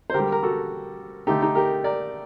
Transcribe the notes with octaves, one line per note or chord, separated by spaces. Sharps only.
C5
D3 G3 G4 A#4
A#4
F#4 A4
D3 A3 D#4 G4
D#4 G4
G4 A#4
A#4 D5